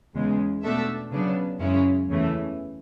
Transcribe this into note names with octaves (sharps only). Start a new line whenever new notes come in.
E2 C#3 G#3
B2 A3 D4 A4 E5
C#3 F#3 B3 D4
F#2 C#3 G#3 C#4 E4
E2 C#3 E3 A3